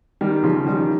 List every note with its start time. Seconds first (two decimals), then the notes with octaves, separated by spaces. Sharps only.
0.21 D#3 G3
0.43 C#3 F3
0.67 D#3 G3